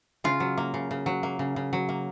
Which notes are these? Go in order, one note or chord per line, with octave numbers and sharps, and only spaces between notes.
C#3 F4
F#3
A#3
C#3
C#3
F#3
A#3
C#3
C#3
F#3
A#3